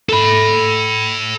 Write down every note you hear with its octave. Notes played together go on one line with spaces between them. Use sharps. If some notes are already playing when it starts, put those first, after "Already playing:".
A4 B5